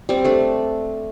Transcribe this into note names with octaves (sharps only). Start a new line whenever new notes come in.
G3 C4
A3 D4